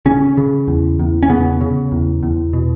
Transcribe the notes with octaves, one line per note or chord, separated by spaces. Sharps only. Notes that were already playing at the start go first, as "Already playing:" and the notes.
C#3 C#4
C#3
E2
E2
C#4
C#3 B3
C#3
E2
E2
B2